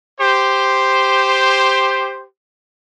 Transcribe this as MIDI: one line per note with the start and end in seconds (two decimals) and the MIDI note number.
0.19 2.25 67
0.19 2.25 72